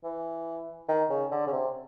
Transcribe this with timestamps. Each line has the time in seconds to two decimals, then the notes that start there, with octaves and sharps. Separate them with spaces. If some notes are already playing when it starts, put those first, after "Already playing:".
0.04 E3
0.89 D#3
1.10 C#3
1.32 D3
1.47 C#3
1.53 C3